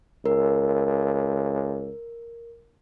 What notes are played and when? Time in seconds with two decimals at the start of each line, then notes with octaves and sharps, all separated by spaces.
0.26 C#2 A#4